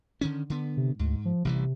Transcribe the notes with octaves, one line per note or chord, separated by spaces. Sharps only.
D3 D#3 C#4
D3 B3
C3
D2 G#2
F3
A1 C3 E3 G3